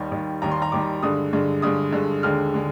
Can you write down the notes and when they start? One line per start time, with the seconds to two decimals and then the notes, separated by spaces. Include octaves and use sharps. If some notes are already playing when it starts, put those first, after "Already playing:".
Already playing: D#2 D#3 G3
0.11 D#2 D#3 G3
0.42 D#2 D#3 G3 A#5
0.52 C6
0.62 A#5
0.72 D#2 D#3 G3 D6
1.03 G2 D3 G#3 D#6
1.33 G2 D3 G#3
1.62 G2 D3 G#3 D#6
1.93 G2 D3 G#3
2.23 D#2 D3 G#3 F6
2.54 D3 G#3